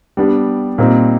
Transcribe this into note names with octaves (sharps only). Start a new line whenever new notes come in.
G3 B3 D4 G4
A#2 G3 C4 D#4